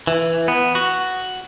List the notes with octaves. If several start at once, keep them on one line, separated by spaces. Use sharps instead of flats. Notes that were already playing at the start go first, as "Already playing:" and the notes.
E3
B3
F#4